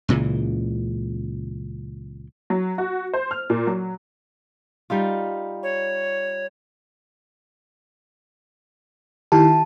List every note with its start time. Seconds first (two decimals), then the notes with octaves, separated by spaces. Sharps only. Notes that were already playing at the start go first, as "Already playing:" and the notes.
0.09 C#2 A#2 C#3 E3
2.50 F#3
2.78 F#4
3.14 C5
3.31 F6
3.50 A#2
3.67 F#3
4.90 G3 D#4 F4
5.63 C#5
9.32 D#3 E4 G4 A5